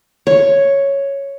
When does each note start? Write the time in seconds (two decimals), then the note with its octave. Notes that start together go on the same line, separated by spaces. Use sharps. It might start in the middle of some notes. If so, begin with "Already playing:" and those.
0.27 C#5